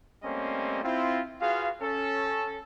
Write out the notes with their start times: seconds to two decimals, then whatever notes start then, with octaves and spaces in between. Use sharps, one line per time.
0.24 G3 A3 A#3 C4 C#4 D#5
0.84 C4 E4 F4
1.41 F4 F#4 G#4 B4 F5
1.82 C#4 A4